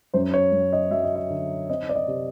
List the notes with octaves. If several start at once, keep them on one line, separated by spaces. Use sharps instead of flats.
F#2 C5
C#5
F#2
D#5
F#3 E5
D#5
E5
D3
C4 D#5
D5
D#5
C3